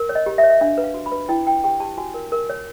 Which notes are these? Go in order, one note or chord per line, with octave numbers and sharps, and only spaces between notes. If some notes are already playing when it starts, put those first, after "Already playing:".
Already playing: A#4
C#5
D#5
G4
E5
C#5
E5
D4 F5
B4
F5
F#4
B5
B4
E4 G5
E4 G5
G4 G5
G4 A5
F#4 G#5
A#4
A#4
C#5